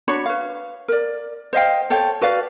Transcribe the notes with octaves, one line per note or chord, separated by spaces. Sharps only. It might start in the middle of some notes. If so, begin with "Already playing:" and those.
D4 F#4 C#5 B5
B4 F5
A#4 D5
C5 D#5 F5 G5
A4 C5 C#5 G5
F#4 B4 D5 F5